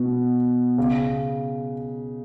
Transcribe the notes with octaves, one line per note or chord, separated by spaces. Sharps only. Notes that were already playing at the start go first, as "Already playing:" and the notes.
Already playing: B2
C#3